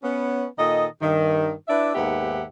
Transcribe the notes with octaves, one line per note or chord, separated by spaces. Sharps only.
B3 C#4
A#2 D#3 A4 D#5
G2 D#3
D4 E4 B4 D5 E5
D#2 G#2 B3 G4 E5 F#5